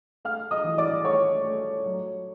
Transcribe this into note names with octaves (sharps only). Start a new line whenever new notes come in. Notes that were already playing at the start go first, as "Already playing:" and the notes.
A3 F5 F6
D#5 D#6
E3
D5 D6
A3 C#5 C#6
A3
F#3